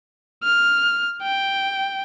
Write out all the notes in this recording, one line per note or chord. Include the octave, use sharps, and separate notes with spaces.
F6
G5